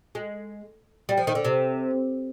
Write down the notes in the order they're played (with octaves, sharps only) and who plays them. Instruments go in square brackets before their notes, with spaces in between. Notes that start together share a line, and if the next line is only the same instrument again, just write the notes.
[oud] G#3
G3
F3
D#3
D3
C3